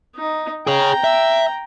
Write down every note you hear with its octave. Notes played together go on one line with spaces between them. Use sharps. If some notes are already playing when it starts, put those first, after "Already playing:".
D#4
G#4 C#5 G5 A#5
E5